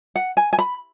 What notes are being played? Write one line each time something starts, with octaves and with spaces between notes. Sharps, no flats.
F#5
G#5
G#5
B5